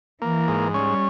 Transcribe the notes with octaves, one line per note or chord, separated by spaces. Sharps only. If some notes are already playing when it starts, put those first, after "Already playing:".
E3 A#3
G#2
G3 C#4